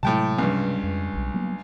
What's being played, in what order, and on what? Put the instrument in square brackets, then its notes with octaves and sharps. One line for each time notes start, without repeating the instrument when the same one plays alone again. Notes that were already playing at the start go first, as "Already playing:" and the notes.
[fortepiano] A2 G5 A5 [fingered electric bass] C3 F#3 G#3
[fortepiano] C#2 G2
[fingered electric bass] F2
D#1 B1
F#3 A#3 B3